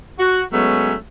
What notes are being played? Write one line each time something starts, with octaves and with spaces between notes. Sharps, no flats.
F#4
F#3 G#3 A3 B3 C#4